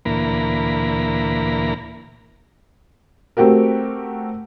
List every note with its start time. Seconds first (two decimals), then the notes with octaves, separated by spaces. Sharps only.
0.05 D2 A#2 E3 A#3 A#5 B5
3.37 A3 C4 F#4 G4 A#4